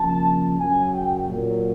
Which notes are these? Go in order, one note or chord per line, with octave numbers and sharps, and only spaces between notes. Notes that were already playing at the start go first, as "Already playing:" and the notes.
Already playing: C#3 F3 A#3 D4 A5
F#2 C#3 F#3 G#5
G5
A#2 F#3 A#3